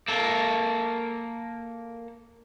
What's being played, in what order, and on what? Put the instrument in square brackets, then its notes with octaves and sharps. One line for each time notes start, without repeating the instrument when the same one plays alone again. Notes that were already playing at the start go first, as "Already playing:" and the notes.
[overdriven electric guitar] A#3 A4